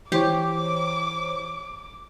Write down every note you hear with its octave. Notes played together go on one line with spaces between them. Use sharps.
E3 G4 C5 C#5 D6